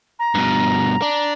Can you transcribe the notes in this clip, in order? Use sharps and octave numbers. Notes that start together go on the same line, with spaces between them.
A#5
G2 B2
D4